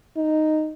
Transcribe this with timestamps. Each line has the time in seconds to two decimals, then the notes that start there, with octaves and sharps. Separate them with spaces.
0.17 D#4